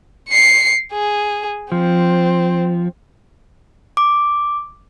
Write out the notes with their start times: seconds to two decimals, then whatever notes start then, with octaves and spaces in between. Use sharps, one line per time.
0.29 C7 C#7
0.93 G#4
1.72 F3 C4
3.97 D6